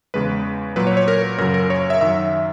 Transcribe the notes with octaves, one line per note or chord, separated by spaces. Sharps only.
E2 C#3 G#3 B4
A#2 F#3 B4
C#5
C#5
A#4
F#2 C#3 F#3 A#4
A#4
C#5
E5
F#2 D#3 F#3 E5